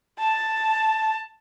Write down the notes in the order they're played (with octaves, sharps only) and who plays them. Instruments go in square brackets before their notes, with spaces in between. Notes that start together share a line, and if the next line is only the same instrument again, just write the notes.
[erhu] A5